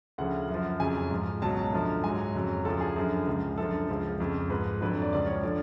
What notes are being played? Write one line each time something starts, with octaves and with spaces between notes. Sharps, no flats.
D2 C#3 F3 F#5
F#2
F3
F2 C#3 F#3 G#5
G#2 F3
C#2 B2 F#3 A5
F#2 D3 F3
G#2 F#3 G#5
F2 C#3 F#3
D2 C#3 F3 A4
G#4
F#2 D3 F3
C#2 C#3 F3
F#2 D3 F3 A4
C#2 C#3 F3
F2 C#3 F3
G#2 F3 B4
F2 D3 F#3 B4
D5
C#2 C#3 F3 D5
C#5
D3 F3 D5